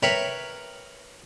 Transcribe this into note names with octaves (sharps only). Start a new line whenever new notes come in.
A#4 B4 C#5 E5 G5